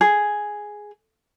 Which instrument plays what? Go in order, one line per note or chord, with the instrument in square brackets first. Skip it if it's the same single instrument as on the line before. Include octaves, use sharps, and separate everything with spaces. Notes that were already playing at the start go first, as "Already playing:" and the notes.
[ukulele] G#4